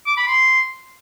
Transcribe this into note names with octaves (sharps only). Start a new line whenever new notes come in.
D6
B5
C6